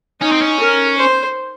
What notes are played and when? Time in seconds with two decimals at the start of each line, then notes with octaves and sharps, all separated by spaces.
0.21 C#4 D#4
0.32 C4
0.41 C#4
0.60 A#4
0.98 C5